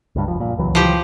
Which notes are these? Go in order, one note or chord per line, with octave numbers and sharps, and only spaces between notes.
C#2 G2
F#1 F3
A#2
C#2 E3 F#3
F3 G4